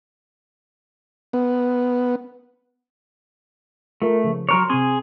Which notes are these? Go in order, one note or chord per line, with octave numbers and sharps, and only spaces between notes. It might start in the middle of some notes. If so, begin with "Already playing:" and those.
B3
A3 F4 A#4
C#3 F3
F#3 A#4 C#5 C6
C3 C4 G#4 G#5 C6